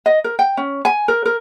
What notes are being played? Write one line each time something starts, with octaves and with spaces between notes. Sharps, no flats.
D#5
A#4
G5
C#4
G#5
A#4
A#4